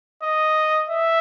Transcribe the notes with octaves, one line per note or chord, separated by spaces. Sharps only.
D#5
E5